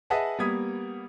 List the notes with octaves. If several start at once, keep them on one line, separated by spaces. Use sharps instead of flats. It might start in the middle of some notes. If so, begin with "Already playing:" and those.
G#4 B4 D#5 E5 F#5 A5
G3 A#3 B3 D#6 G#6 B6